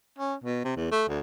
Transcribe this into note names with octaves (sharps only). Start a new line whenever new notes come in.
C#4
B2
C3
E2
A3
D2